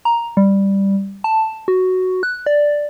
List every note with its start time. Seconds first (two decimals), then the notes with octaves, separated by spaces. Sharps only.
0.05 A#5
0.37 G3
1.24 A5
1.68 F#4
2.23 F#6
2.46 D5